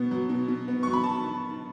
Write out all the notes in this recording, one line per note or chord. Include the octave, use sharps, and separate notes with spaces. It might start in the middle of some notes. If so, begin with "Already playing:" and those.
Already playing: B2 B3
F#3
B2
B2
B3
F#3 C#6
B5
A5